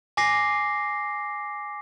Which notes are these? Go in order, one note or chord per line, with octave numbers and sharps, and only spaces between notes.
G#5 D6 A#6 C7